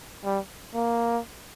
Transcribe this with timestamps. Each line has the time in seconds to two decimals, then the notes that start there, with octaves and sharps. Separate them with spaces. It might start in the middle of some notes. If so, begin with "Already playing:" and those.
0.24 G3
0.75 A#3